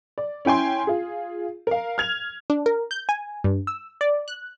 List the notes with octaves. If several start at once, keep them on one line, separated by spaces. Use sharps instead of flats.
D5
C#4 E4 G5 G#5 C6
F4 G#4
A#4 F5
F6 G#6 F7
D4
A#4
G6
G#5
G2
E6
D5
F#6